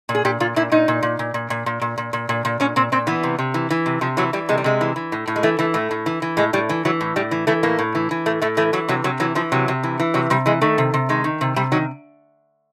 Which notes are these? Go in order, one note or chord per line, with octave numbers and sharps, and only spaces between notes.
A#2
G#4
A#2 G4
A#2 F4
A#2 E4
A#2 D#4
A#2
A#2
A#2
A#2
A#2
A#2
A#2
A#2
A#2
A#2
A#2
A#2 C#4
A#2 C4
A#2 C4
E3 B3
C3
C3
E3
E3
C3
C3 F3
E3 F#3
E3 G3
C3 G#3
G3
C3 G#3
E3
E3
A2
A2
G#3
E3 A3
E3 A3
A2 A3
A2
E3
E3
A2 G#3
A2 G3
E3
E3 F#3
A2
A2 G3
E3
E3 A3
A2 A#3
A2
E3
E3
A2 A3
A2 A3
E3 A3
E3 F#3
C3 F#3
C3 F#3
E3 F#3
E3 F3
C3 F#3
C3
E3
E3
C3 F#3
C3 G3
E3 G#3
D#3 A3
C3
C3
D#3 G#3
D#3
C3
C3 G3
D#3 F#3